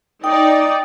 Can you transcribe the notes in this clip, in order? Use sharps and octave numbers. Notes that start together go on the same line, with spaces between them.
D#4 D5 G5 D#6